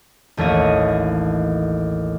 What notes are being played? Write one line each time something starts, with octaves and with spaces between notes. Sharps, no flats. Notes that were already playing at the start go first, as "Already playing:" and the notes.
A1 D#2 A3 C#5 D#5